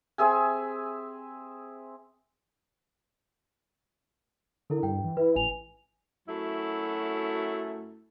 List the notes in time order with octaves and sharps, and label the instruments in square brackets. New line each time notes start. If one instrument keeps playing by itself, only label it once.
[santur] C4 G#4 E5 G#5
[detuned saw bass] D3 [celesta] E4 A4 A#4
[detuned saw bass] G2 [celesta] G5
[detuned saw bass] E3
[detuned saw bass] E4 [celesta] B4
[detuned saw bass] A1 [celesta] G#5 F7
[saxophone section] F#2 F#3 A3 E4